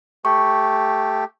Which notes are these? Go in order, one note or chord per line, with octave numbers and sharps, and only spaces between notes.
A3 G4 C#6